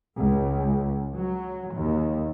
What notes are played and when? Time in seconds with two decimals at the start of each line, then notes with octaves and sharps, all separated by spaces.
0.17 C#2
1.14 F#3
1.74 D#2